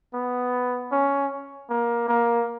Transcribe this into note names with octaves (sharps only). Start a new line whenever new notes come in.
B3
C#4
A#3
A#3